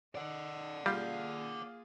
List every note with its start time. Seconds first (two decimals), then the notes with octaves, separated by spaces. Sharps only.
0.15 D#4 D5 F#5
0.86 G3 A#3 F4 G#4 F5 G6